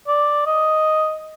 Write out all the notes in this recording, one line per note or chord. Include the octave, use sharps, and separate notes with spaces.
D5
D#5